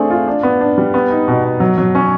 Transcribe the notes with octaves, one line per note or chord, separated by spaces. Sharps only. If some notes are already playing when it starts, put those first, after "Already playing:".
Already playing: A3 C4 D4 G#4
F4
D4
B3
D4
G3
B3
D#4
B2
B2
F#3
F#3
C#4